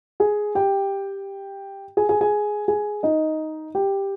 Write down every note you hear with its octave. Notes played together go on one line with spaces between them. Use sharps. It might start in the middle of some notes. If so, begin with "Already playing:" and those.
G#4 G#5
G4 G5
G#4 G#5
G#4 G#5
G#4 G#5
G#4 G#5
D#4 D#5
G4 G5